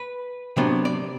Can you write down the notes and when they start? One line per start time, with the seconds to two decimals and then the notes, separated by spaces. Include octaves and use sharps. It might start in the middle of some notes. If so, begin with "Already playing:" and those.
Already playing: B4
0.57 C3 F#3 B3 D4 C5
0.85 D5